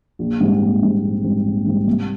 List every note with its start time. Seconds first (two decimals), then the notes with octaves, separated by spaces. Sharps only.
0.19 A#1
0.41 G#2 G3 C4
0.61 A#1
0.82 G#2 G3 C4
1.03 A#1
1.24 G#2 G3 C4
1.45 A#1
1.66 G#2 G3 C4
1.87 C2